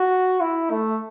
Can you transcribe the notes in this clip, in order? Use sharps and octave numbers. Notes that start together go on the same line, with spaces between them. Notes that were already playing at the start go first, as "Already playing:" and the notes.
Already playing: F#4
E4
A3